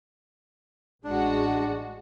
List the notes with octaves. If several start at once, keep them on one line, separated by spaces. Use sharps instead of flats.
A1 G#3 D4 F#4